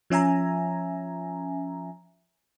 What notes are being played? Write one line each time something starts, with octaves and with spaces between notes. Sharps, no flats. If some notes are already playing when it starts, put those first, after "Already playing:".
F3 C#4 E5 G#5 A#5